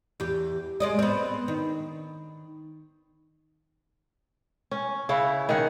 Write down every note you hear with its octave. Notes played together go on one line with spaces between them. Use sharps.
E2 G4
G#3 D5 D#5
B3 C4
D#3
C#4
C#3 E4 F#5
D#3 G#4 F#5